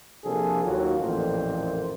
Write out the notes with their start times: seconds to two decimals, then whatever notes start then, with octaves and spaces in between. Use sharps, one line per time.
0.25 C3 F3 A#3 D4 G#4 A4
0.64 D#2 F#3 F4
1.00 A1 F2 A#2 A#3 C4 C5